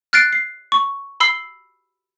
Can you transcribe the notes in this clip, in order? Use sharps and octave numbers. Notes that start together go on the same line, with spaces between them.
F6 F#6 A6 C7 D7
C7
C#6
B5 E6 C7 G7